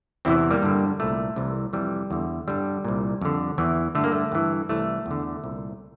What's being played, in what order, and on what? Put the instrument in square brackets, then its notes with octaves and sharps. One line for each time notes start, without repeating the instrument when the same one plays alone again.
[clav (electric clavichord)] E2 C3 E3 C4 E4
G3 A#3
G2 D3
C2 A#2 A3
C2 C3 E3
F2 C3 E3 G3
E2 D3
G2 D3 G3
C2 A#2
F2 D3
E2 E3
G2 D3 A3
A#3
A3
G2 E3
C2 C3 E3 A3
E2 D3
C2 A#2